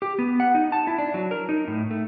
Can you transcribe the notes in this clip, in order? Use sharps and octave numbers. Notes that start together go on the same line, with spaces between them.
G4
B3
F#5
D#4
A5
E4
D4
F#3
A#4
D#4
A2
A3